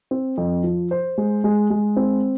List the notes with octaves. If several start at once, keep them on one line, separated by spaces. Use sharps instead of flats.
C4
F2
F3
C5
G#3
G#3
G#3
C4